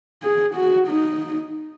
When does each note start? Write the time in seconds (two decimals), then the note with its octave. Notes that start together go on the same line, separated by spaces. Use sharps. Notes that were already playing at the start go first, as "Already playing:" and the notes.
0.23 G#4
0.55 F#4
0.88 D#4